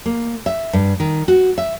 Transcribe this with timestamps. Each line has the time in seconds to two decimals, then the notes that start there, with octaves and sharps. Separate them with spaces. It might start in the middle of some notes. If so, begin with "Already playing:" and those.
0.06 A#3
0.46 E5
0.73 G2
1.00 D#3
1.28 F#4
1.58 E5